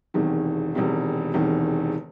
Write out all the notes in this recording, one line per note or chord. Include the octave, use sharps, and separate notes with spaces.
E1 E2 C3 D#3
E1 E2 C3 D#3
E1 E2 C3 D#3